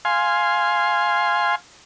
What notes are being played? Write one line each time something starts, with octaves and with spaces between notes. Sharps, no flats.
F5 G#5 C6